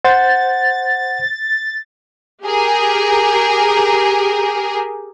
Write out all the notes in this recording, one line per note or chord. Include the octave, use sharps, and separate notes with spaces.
C5 F#5 G6 A6
G4 G#4 A#4